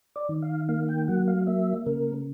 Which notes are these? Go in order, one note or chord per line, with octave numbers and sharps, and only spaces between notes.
D5
D#3
F5
A#3 F5
G5
F#3 F#5
F5
A#3 E5
C#3 A#4